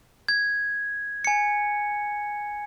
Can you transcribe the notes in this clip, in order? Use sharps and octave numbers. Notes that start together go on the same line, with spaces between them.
G#6
G#5 C#7